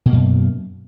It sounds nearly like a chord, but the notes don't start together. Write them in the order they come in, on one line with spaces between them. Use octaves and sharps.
B2 A#3 F#2